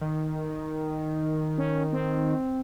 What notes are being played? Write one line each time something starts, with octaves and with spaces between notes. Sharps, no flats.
D#3
C#4
C4